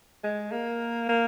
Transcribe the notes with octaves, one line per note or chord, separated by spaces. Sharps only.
G#3
A#3
A#3